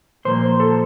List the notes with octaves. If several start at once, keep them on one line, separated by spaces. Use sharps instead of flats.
A#2 F3 A#3 C5
A4